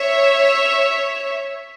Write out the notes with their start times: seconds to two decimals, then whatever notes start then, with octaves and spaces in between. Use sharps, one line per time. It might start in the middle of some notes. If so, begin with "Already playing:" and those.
Already playing: C#5 E5